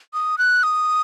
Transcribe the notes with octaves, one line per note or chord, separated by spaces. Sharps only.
D#6
F#6
D#6